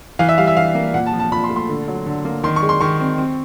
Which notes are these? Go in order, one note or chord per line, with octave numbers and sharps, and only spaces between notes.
E3 F5
E5
G3 F5
E5
E3 F5
A#3
A#2 F#5
A5
F3
A5
A#2 B5
C6
A3
C6
D3
F#3
D3
A#3
D#3 C6
C#6
G#3
C6
D#3 C#6
C4
C4